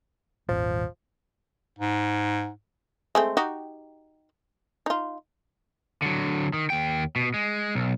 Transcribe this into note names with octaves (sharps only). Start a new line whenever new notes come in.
D#1 G#1 F3
G#2
G#3 A3 C4
D#4 F#4 G4
D#4 F4
D3 F#3
D#3
D#2 G5
B2
G#3
B1